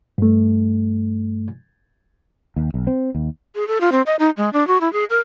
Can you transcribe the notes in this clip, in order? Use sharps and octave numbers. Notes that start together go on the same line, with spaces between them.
G2 A3
D#2
B1
C4
D#2
G#4
A4
F4
C4
D#5
D#4
G#3
D4
F#4
E4
G#4
A#4